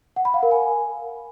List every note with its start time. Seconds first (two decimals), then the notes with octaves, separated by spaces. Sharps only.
0.16 F#5
0.25 B5
0.34 F5
0.43 A#4
0.51 G#5